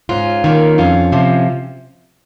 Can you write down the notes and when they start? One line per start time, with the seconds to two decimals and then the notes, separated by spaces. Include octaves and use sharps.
0.09 G#2 C#4 F4
0.44 D#3 A#3
0.78 F2 C#4 F4
1.12 C3 F3